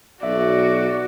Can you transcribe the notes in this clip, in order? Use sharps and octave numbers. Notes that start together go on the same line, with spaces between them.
B1 F#4 D5 E5